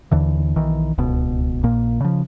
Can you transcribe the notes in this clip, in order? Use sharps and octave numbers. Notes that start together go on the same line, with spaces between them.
D#2 D3 E3
B1 D#3 E3
D1 C#2 B2
A#1 A#2 A#3
C#3 F3